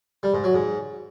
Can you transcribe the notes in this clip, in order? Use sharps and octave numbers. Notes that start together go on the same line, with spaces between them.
G3
G#2
F#3
G#2